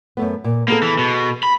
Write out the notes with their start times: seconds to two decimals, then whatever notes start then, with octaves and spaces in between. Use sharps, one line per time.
0.17 F#2 A3 B3
0.44 A#2
0.68 A#3 B3 G#4 A4
0.82 E3
0.99 B2
1.43 B5